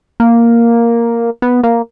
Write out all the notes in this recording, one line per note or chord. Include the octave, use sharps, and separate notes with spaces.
A#3
B3
A#3